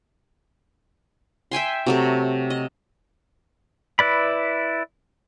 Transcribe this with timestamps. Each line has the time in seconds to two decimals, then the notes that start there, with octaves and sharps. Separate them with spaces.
1.51 E5 G5 G#5 C6
1.86 C3 F#3 A3
2.50 D#5
3.99 E4 B4 D5 B5